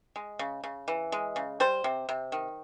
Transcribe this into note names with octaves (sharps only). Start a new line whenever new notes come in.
G#3
C#3
C#3
E3
G#3
C#3
G3 C5
C3
C3
D#3